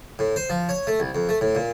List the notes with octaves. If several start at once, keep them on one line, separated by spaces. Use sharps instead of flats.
A2
C5
F3
C#5
A3
C2
F2
A3
A2
A#2